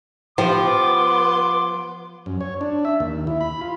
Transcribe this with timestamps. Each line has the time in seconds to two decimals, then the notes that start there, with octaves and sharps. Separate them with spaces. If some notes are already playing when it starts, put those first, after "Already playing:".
0.38 F3 B3 G4 C5 C6 D6
2.26 F#2
2.41 C#5
2.61 D4
2.85 E5
3.00 D#2
3.27 E4
3.41 B5
3.61 F4